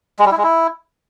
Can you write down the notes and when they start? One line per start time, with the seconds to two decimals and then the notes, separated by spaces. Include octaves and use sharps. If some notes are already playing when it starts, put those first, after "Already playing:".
0.19 G#3
0.25 G3
0.31 E4
0.37 G#3
0.43 E4